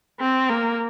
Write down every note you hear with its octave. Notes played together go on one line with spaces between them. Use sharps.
C4
A#3